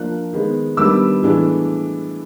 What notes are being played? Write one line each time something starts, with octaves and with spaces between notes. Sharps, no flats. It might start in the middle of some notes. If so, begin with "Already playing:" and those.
Already playing: F3 A#3 D4 F#6
D#3 G#3 B3
D#3 G3 B3 D4 D6 E6
A2 E3 G#3 B3 D4